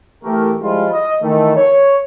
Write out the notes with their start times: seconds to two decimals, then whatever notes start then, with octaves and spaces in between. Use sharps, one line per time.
0.24 E3 A3 G4 A#4
0.62 F3 G3 G#3 E4 F4
0.92 D#5
1.22 D#3 E3 A3
1.56 C#5